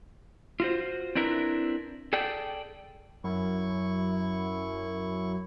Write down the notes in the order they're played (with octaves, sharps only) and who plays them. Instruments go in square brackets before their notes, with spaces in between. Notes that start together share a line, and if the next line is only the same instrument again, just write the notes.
[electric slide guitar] F4 F#4 C5
C4 D4 E4 A#4 B4
G#4 A4 D5 G5
[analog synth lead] F#2 [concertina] E4 C#6